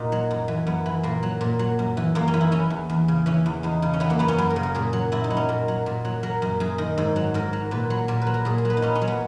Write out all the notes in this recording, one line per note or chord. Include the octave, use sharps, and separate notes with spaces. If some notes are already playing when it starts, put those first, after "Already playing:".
Already playing: A#2 D#4 F#4 A#4
F#3
F#2
E3
F#2 B3
E3
A#2 A#3
F#3
A#2
F#3
F#2
E3
F#2 A#3
C#4
E3
E4
E3 C#4
E2
E2
C#3
E3 C#4
E2
E2 D#4
C#3
C#4
E3 B3
A#3
F#2 B3
C#4
F#2
A#4
C#3
A#4
A#2 G#4
F#3
A#2 E4
D#4
F#3
C#4
A#2 A#4
F#3
A#2
F#3
F#3 A#4
F#2
F#2 G#4
D#3
G#2
F#3
G#2 A#4
F#3
A#2 B4
F#3
A#2 A#4
B4
F#3
A#4
A#2 G#4
G#4
F#3
B4
D#4
A#2 C#4
C#4
F#3
B3